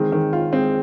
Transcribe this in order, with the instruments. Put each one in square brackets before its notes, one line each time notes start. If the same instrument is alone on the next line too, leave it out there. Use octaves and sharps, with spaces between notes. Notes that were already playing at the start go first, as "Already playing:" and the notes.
Already playing: [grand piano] D#3 C4 [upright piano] G#3
[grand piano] D#3
F4
[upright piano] G#3 [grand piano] C4